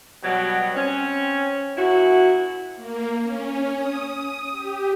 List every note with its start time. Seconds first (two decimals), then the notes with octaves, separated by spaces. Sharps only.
0.22 B2 F#3 G3
0.75 C4 C#4
1.75 F#2 E4 F#4
2.76 A#3
3.22 C#4
3.76 D#6
4.52 G4